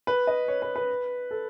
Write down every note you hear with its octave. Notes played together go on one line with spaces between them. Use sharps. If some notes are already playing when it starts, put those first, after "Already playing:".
B4
D#5
C#5
B4
B4
A4